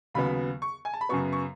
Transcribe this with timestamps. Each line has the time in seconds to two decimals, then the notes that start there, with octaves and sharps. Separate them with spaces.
0.14 D#2 C#3 F#3 B3 B5
0.62 C#6
0.85 G#5
0.94 A5
1.01 B5
1.09 F#2 C#3 F#3 B3 C#6
1.33 C#6